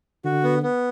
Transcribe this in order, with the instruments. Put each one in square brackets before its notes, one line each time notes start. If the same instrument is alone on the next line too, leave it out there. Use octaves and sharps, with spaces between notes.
[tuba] D3 [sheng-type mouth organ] F#4
[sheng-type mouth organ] B3
B3